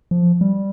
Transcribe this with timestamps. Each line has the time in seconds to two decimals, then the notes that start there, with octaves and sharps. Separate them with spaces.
0.11 F3
0.41 G3